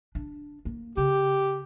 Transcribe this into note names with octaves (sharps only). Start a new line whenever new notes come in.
D4
A#3
C#3 G4